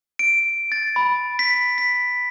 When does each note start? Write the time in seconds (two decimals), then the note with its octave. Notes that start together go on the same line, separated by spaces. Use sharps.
0.19 D7
0.72 A6
0.96 B5
1.39 B6
1.78 B6